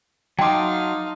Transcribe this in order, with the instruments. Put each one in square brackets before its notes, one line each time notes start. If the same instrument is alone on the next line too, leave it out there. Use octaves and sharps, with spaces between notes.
[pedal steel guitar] F#3 D6 [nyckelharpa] D#4 F5 [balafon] G5 [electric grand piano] A5 C6